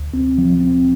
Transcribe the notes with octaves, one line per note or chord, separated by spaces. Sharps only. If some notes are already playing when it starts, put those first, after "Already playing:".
Already playing: D2
C4
F3
C4